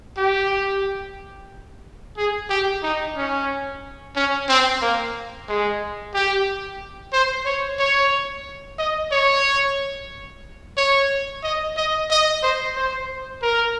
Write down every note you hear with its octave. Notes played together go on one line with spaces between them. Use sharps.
G4
G#4
G4
D#4
C#4
C#4
C4
A#3
G#3
G4
C5
C#5
C#5
D#5
C#5
C#5
D#5
D#5
D#5
C5
C5
A#4